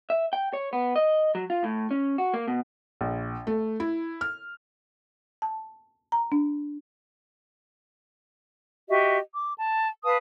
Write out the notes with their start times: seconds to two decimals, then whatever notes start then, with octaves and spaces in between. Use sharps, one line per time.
0.10 E5
0.33 G5
0.53 C#5
0.73 B3
0.96 D#5
1.35 F#3
1.50 F4
1.64 A2
1.91 C#4
2.18 F#4
2.34 A#3
2.48 B2
3.01 A#1
3.47 A3
3.80 E4
4.21 F6
5.42 A5
6.12 A#5
6.32 D4
8.89 F#4 G4 D#5 E5
9.35 D6
9.58 A5
10.04 B4 F5 A5 D#6